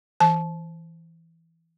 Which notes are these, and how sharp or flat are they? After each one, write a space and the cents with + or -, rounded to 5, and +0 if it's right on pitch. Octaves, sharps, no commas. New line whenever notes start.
E3 +0 A5 -25